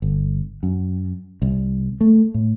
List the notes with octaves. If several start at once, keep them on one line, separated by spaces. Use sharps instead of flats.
G1
F#2
C2
A3
A2